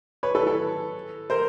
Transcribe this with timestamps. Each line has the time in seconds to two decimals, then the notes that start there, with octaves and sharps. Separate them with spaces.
0.23 B4 C#5
0.35 A4 B4
0.47 A4 B4
1.30 A#4 C5